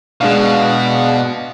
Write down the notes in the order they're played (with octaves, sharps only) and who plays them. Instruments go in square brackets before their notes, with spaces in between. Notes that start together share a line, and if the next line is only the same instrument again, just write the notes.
[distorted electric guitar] B2 [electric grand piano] G#3 D4 F5